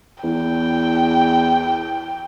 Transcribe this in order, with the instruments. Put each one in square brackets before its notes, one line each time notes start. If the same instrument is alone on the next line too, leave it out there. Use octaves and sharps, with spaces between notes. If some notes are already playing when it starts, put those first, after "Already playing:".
[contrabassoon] E2 [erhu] G5